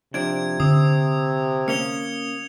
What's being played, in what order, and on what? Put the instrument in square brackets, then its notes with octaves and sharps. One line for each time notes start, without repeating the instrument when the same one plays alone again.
[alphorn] C3 [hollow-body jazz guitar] F3 D4 [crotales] G#6 D7
[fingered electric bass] D3 [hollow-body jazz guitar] C4 [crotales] D#6
[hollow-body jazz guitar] A#3 C#4 C#5 [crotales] C#7 F7 G7